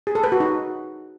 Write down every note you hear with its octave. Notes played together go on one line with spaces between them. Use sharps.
G#4
A4
B4
F#4
D#4